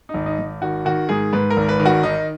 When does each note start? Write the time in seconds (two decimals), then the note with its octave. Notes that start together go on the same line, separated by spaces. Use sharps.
0.09 G#1 D#4
0.26 D#4
0.39 G#1
0.61 D#3 F#4
0.85 D#3 F#4
1.09 G#2 G#4
1.33 G#2 B4
1.50 A#4
1.56 G#1
1.69 B4
1.80 D#3
1.86 F#4
2.03 D#3 D#4